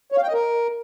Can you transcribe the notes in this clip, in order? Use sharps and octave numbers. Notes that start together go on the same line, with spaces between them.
C#5
F5
G5
D#5
A#4